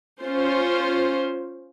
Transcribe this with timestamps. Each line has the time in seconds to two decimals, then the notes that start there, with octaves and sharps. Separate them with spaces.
0.22 C#4 F4 C5